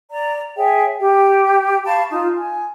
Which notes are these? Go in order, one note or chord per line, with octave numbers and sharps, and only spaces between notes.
D5 A#5
G#4 C#5 E5 G5
G4
F5 A5 B5 C#6
D#4 F4
G#5